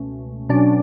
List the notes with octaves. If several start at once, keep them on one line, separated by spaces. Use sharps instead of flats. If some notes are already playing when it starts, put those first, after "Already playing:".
Already playing: C#2 B2 A3 C#4
B2 F#3 C#4 D4 D5